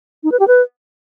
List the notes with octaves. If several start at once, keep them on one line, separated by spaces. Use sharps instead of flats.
D#4
B4
G4
B4